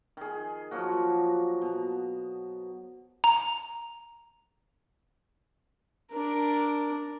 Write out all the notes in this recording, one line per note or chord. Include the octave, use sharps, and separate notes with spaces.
D#3 G#4
F3 F#3 A#3 F#4
B2
A#5
D4 A#4